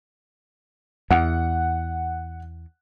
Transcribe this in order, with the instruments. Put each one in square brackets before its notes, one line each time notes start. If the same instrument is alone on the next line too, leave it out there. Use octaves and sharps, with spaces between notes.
[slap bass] E2 [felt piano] F#5